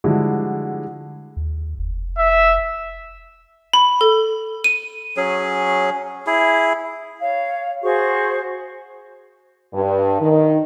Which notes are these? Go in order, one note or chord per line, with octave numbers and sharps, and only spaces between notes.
D3 F3 G3 G#3 E4 F#4
D#2
F1
E5
B5
A4
D#7
F#3 C#4 G#4
E4 G#4
C#5 F5
F#4 G#4 C5 C#6
G2
D#3